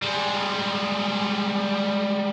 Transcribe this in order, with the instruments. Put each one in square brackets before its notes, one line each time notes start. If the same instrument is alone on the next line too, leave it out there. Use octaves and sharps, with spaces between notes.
[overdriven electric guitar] G3 G#3